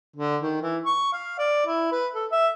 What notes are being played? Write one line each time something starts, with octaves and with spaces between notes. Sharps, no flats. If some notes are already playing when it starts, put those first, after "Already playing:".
D3
D#3
E3
C#6
F5
D5
E4
B4
A4
E5